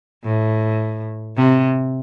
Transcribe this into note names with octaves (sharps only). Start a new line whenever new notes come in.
A2
C3